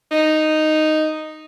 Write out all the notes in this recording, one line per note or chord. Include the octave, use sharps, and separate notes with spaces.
D#4